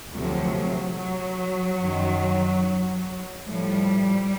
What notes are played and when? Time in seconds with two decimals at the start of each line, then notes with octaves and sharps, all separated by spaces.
0.12 D2 C3 F3 F#3
0.96 F#3
1.79 F#2 D#3
3.46 A2 F3 G3